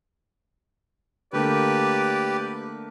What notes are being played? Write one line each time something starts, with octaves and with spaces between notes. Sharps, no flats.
D3 A3 A#3 G4 B4 D5